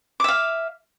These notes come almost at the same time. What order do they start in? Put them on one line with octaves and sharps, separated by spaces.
D6 E5 F5